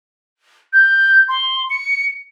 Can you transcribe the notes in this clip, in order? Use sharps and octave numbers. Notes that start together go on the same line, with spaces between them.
G6
C6
C#7